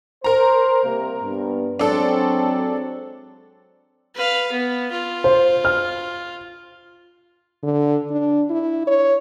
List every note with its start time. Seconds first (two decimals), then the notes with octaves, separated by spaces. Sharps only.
0.24 A#4 C5 A#5
0.85 C3 G3 A#3
1.23 G2 B3
1.79 F#3 G#3 C4 D4 A4
4.15 B4 F5
4.52 B3
4.91 F4
5.24 C5
5.65 F6
7.63 D3
8.11 D4
8.50 E4
8.87 C#5